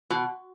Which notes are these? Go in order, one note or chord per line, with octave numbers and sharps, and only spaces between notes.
B2